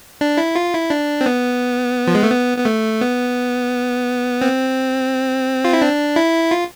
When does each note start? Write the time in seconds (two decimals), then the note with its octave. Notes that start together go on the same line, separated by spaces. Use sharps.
0.21 D4
0.38 E4
0.55 F4
0.73 E4
0.90 D4
1.21 C4
1.26 B3
2.07 F3
2.15 G#3
2.23 A3
2.31 B3
2.58 B3
2.65 A3
3.01 B3
4.42 C4
5.65 F4
5.73 E4
5.82 D4
6.16 E4
6.51 F4